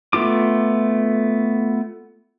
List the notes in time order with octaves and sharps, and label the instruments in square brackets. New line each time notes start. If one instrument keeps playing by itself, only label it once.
[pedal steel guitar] A3 B3 F4 D6